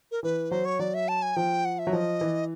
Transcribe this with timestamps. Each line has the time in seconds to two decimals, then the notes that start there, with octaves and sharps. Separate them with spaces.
0.12 A#4
0.23 E3 B4
0.51 F#3 C5
0.65 C#5
0.79 F#3 D5
0.94 E5
1.08 A5
1.22 G#5
1.36 F3 G5
1.65 F#5
1.79 E5
1.87 F#3
1.93 F3 D#5
2.21 E3